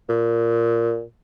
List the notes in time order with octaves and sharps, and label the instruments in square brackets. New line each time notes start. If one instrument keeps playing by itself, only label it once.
[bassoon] A#2